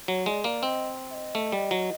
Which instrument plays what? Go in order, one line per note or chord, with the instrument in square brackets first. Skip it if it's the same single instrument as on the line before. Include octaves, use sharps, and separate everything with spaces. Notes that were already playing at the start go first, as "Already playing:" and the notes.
[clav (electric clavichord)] F#3 [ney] C#5
[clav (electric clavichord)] G#3 [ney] D5
[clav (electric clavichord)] A#3 [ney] D5
[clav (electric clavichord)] C4 [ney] D#5
[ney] E5
D#5
[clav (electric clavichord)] A3
G3
F#3